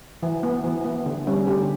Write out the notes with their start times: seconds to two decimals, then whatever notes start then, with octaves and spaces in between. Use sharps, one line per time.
0.23 E3
0.43 B3
0.64 E3
0.84 B3
1.06 D3
1.27 G3 C#4
1.47 D3 G4